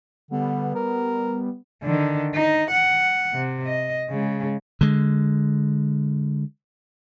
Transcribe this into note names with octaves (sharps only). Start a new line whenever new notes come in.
D3 G3 B3
A#4
D3 D#3
D#4
F#5
C3
D#5
C#3 G#3
D3 G#3